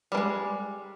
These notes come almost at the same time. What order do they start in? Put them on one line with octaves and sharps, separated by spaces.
G3 A#3 G#3